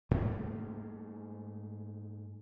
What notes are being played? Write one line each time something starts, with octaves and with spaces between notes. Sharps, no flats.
G#2 G3 A3 A#3